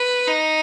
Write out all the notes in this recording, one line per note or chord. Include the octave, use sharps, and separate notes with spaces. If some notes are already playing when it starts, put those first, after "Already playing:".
Already playing: B4
D#4